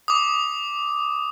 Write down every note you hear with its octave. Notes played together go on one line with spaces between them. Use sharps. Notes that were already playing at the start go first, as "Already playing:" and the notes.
D6 D#6